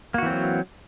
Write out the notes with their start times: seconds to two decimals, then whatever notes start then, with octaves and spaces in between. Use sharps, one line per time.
0.14 A#3
0.18 F#4
0.22 E3
0.26 C4
0.30 F#3